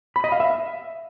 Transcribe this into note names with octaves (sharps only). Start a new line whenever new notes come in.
B5
D#5
F5
E5